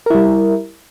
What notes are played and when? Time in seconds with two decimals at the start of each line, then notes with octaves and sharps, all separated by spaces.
0.06 A#4
0.10 E4
0.15 G3